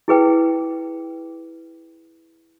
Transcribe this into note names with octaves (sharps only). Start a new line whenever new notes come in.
E4 G#4 B4 G5